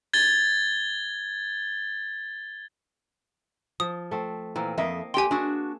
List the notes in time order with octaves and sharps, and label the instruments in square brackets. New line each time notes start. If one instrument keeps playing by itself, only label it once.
[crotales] G#6 A6 G7
[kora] F3 [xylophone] D#6
[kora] A3 C4
[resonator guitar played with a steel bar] A#2 [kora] E3 C4
[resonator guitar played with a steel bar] F2 E5 [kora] A#3 D#5
[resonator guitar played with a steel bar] G4 G5 [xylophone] G#5 C6
[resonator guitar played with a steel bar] D4 F#4 [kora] G#4 E5